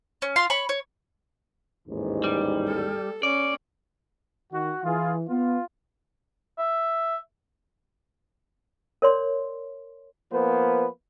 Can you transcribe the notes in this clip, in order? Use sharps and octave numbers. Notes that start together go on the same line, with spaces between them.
C#4
F4 F5 C6
C#5 B5 C#6
C#5
A1 D#2 G#2
G3
A4
C#4 D5
D#3 F#4
E3 F4 G#4
B3 F4
E5
A#4 C#5 D5 C6
F3 A#3 B3 B4 C5